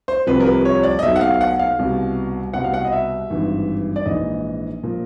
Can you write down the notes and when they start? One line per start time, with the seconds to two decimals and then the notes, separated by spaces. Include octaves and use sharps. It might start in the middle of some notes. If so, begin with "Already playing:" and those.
0.08 C5
0.27 C2 C3 F3 B4
0.40 A#4
0.46 B4
0.65 C#5
0.83 D5
0.99 D#5
1.03 B1 B2 E5
1.16 F#5
1.21 F5
1.34 F5
1.41 F#5
1.59 F5
1.79 C2 B2
2.54 C2 B2 F#5
2.64 F5
2.74 F#5
2.85 D#5
2.92 E5
3.30 G#1 G2 E3
3.96 D5
4.06 A#1 G#2 E3 D#5
4.83 A#2 F3